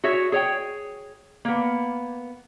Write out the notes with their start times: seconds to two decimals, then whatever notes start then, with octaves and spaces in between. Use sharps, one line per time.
0.04 F#4 G#4 C#5 E5
0.32 G#4 C#5 G5
1.45 A#3 B3